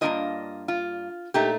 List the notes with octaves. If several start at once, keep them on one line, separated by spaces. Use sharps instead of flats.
G2 D#3 A#3 D4 F4 D#5
F4
A#2 A3 D#4 G4